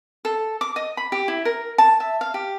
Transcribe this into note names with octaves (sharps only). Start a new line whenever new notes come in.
A4
D6
D#5
B5
G4
E4
A#4
A5
E5
F5
G4